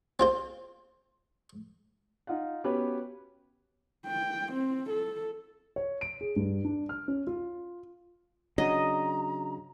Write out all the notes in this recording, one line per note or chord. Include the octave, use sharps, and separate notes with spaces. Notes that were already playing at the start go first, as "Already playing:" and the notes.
C4 F4 C5
D#4 F4 F5 F#5
B3 C#4 F#4 G4 B4 C#5
G5
C4
A4
C#5
D7
G#4
G2
D4
F6
C#4
F4
C#3 F#3 D4 F#4 D#5 A#5